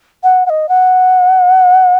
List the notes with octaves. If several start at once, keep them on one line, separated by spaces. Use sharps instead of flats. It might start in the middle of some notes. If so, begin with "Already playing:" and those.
F#5
F#5
D#5
F#5